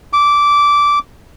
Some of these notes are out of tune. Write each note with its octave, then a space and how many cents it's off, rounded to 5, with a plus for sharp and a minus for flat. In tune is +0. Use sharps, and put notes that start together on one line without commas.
D6 -15